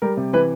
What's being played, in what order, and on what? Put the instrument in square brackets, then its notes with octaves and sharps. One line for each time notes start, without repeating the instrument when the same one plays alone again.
[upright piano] G3 A#4
C3
E3 B4